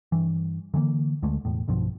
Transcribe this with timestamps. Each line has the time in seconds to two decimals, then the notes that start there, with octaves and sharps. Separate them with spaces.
0.12 G2 E3
0.74 D3 E3 G3 A#3
1.22 D2 D3 G#3 A3
1.45 E1 E2 A2
1.68 B1 G2 B2 F3